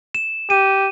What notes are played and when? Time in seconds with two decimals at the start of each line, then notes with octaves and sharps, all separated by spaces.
0.15 E7
0.50 G4 D#7